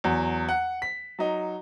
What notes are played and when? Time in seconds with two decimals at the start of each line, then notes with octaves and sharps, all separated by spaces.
0.04 E2 F#3
0.49 F#5
0.82 B6
1.19 F#3 D#4